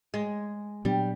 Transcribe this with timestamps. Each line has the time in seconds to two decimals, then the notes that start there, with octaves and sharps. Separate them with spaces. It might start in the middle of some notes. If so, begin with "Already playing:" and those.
0.14 G#3
0.85 A#2 F#3 G3 B3 D4